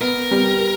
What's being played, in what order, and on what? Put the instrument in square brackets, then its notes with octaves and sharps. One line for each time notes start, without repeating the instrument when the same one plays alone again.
[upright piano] B3 [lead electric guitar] A#4
[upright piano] G3